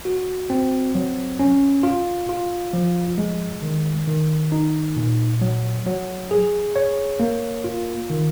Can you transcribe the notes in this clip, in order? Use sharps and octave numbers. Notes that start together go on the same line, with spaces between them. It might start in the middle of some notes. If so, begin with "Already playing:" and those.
F#4
C4
F#3
C#4
F4
F4
F3
G#3
D#3
D#3
D#4
A#2
F#3
F#3
G#4
C#5
A#3
F4
D#3